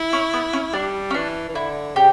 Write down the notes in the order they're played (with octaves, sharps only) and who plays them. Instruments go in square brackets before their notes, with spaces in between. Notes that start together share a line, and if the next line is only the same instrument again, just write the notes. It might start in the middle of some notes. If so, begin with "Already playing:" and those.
Already playing: [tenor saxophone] E4
[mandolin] C#4
B3
C#4
[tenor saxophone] G3 [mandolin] D4
[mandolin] C#4
[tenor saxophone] E3 [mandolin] D4
[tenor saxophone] E3
[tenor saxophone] D3 [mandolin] E4
[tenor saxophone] C#3 [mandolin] G4